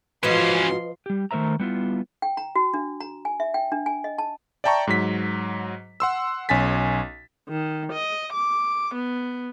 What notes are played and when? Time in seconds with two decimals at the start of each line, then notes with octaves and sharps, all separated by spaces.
0.23 G#2 E3 F3 C#4 F#4 B4 D#5 C6
1.06 G3 G4
1.31 D#3 A3 A#4 C5 E5 A#5
1.60 G3 B3 E4 F4
2.22 G5
2.37 A#5
2.55 F#4
2.74 D4
3.00 A#5
3.25 G#5
3.40 E5
3.54 G5
3.72 D4
3.86 G#5
4.04 D#5
4.18 A5
4.64 D5 E5 G5 A5 A#5 C#6
4.87 G#2 F#3 B6
6.00 F#5 C6 E6
6.49 B1 C#4 G#5 A6 B6
7.48 D#3
7.94 D#5
8.34 D6
8.95 B3